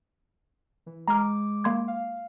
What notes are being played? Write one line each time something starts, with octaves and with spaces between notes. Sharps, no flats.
E3
G#3 A#5 D6 F6
A#3 C6 G#6
F5